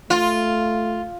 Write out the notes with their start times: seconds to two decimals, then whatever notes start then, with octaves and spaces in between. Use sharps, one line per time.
0.10 A3 F4